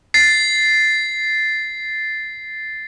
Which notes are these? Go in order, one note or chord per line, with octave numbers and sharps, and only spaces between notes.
A6 C7